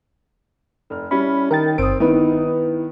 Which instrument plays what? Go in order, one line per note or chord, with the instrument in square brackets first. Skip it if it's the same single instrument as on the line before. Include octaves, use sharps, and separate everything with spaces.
[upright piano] F1 F6
[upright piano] G3 E4 [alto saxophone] C#4 [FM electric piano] B5
[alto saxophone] D#3 [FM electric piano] A#4 G5 A6
[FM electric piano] G1 [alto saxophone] C4 [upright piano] D#6 D7
[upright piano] D#3 B3 [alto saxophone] D#4 [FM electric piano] E4 B4